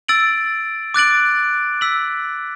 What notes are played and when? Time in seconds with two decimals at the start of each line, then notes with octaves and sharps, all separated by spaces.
0.08 E6 A6 D7 F#7
0.94 D6 F#6 A6 D7 F#7
1.81 E6 B6 F#7